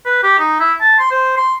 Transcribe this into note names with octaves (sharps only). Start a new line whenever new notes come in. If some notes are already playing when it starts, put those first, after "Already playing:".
B4
G4
D#4
E4
A5
C6
C5
C6